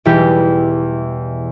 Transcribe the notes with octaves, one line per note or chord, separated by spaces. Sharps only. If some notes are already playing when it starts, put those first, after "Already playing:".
E2 B2 E3 G3 G4